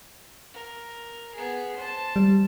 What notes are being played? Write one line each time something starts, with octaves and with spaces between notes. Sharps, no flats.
A#4
B3 G#4
C5 A5
G3